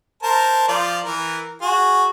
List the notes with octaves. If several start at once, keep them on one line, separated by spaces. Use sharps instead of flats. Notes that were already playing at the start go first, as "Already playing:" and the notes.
A#4 C5 A5
F3 F4 D5
E3 A#4
F#4 G#4